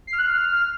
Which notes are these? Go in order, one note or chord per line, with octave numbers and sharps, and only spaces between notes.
C7
F6
F#6
F6